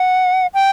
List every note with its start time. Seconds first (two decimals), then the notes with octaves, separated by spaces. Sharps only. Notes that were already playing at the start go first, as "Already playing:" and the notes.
Already playing: F#5
0.54 G5